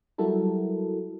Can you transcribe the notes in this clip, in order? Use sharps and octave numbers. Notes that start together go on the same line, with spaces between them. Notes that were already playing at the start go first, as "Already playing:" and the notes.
F#3 G3 E4 F#4 A4 A#4